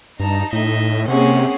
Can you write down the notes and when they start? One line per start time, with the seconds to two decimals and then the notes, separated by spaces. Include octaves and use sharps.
0.20 G2 D#4 A5 A#5
0.53 A2 D#5 E5
1.08 C3 A#3 C4 C#4 G#4 F#5